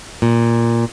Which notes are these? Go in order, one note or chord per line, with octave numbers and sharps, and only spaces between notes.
A#2